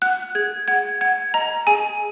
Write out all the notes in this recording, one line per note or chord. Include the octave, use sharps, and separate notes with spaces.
F#5 F#6
G#4 G#6
F#5 G#6
F#5 G#6
D#5 A#5
G#4 G#5